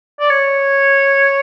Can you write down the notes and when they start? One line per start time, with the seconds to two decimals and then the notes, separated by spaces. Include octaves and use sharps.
0.20 D5
0.30 C#5